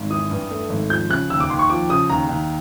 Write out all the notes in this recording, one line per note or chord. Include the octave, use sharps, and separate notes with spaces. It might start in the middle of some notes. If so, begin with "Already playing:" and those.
Already playing: G#1
E3 D#6
G2
A3
G#1
F3 G6
C#3 F#6
D#2 E6
D6
D#2 C6
C#6
F3 D6
C#3 D#6
D#2 A#5
D#2